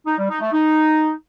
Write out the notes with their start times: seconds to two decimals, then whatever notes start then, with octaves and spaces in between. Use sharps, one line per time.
0.07 D#4
0.18 G3
0.30 D#4
0.41 A3
0.53 D#4